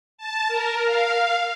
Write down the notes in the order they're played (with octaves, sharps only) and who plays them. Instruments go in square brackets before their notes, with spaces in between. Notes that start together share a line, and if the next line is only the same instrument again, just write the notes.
[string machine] A5
A#4
F5